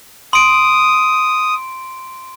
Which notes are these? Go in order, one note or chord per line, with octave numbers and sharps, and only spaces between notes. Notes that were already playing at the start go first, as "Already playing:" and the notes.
C6 D#6 D7